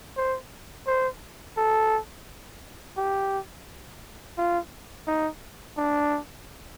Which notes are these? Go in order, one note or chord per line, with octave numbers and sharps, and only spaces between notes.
C5
C5
A4
G4
F4
D#4
D4